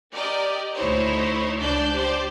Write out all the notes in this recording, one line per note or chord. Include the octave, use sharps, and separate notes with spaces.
G4 A#4 D5 D#5
D2 D#4 E4 C5 C#5
C#2 D4 D5 A5 G6
G4 C5 D5